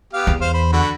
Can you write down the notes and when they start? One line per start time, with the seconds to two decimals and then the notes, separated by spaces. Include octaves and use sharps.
0.13 B3 G4 F5
0.27 E2
0.41 C5 F5
0.54 C5 B5
0.73 D3 F#4 B5